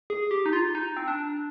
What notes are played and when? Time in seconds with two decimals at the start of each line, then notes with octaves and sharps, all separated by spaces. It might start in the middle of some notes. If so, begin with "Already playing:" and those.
0.10 G#4
0.31 G4
0.46 D#4
0.53 F4
0.75 D#4
0.97 C4
1.08 D4